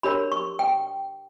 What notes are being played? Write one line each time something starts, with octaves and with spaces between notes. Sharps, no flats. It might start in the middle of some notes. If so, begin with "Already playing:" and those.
D4 G4 A#4 C#5 B5
C#6
G5